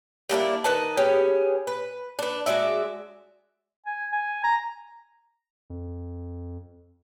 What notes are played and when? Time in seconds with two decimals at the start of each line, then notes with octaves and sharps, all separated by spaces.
0.29 G3 A#3 D4 E4
0.64 D#3 B4 D#5 A5
0.97 B3 C#4 G4 G#4
1.67 B4
2.19 D4 B4
2.46 G#3 F#4 D5 E5
3.86 G#5
4.13 G#5
4.44 A#5
5.70 F2